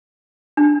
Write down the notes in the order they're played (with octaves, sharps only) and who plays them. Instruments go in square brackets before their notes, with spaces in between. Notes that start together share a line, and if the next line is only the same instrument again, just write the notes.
[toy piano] D4